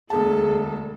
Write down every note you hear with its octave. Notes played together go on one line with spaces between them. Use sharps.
E1 D2 G#4 A4 A5